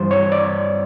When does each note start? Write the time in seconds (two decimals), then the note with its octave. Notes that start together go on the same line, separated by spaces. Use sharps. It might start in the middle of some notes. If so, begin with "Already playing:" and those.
Already playing: G2 E3 G3 C5
0.11 C#5
0.32 D5